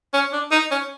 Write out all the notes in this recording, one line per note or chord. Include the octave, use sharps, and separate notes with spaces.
C#4
D4
D#4
C#4